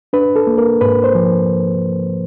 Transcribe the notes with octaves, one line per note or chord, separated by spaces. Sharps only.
D4 B4
A4
A#3
A#4
G#2 B4
C5
F3